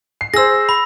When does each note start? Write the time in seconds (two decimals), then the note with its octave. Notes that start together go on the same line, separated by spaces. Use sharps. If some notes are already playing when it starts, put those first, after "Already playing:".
0.21 C7
0.34 G#4 C5 E6 A#6
0.69 B5